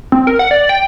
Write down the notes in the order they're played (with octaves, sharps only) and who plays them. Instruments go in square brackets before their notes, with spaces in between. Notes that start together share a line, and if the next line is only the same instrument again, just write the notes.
[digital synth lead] C4
A#4
F#5
D5
G5